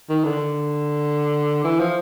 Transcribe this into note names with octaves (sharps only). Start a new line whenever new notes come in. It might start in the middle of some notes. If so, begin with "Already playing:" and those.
D#3
D3
E3
F3